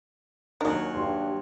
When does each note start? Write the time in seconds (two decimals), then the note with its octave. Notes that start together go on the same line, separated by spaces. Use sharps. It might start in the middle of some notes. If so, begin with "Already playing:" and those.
0.61 D#2 F#3 D4 D#4 A#4 G#5
0.95 G2 C6